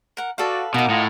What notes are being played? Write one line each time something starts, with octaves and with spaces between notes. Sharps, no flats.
A#4 F#5
F#4 A4 B4 D5 F5
B2 A#3 D#4 A#4 F#5 D6
A2 F4 D#5